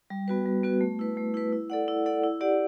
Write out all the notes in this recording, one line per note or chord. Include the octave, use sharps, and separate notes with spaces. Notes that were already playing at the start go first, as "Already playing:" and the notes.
G3
B3 F#4 B4
G3
B3 F#4 B4
A3
E4 B4
A3
E4 B4
E4
A4 D5 F#5
E4
A4 D5 F#5
E4
G4 D5 F#5